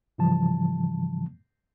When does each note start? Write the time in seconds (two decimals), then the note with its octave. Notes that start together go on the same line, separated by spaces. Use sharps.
0.18 G#2 C#3 E3 F3 G3 A5